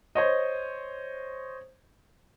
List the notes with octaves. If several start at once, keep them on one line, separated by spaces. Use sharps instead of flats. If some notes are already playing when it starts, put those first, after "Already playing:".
C5 C#5 D#5